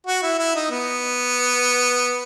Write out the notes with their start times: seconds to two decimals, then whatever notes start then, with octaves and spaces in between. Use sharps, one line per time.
0.06 F#4
0.23 E4
0.39 E4
0.55 D#4
0.71 B3